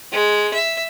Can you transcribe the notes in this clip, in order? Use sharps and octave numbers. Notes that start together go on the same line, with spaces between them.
G#3
E5